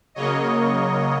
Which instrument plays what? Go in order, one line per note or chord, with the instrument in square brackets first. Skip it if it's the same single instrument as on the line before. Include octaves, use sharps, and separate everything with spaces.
[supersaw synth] C#3 F#3 A#3 C#5 D#5